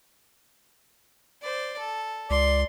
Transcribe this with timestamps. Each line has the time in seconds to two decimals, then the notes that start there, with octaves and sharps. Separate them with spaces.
1.42 C5 D5
1.78 A4
2.30 C#2 D5 C6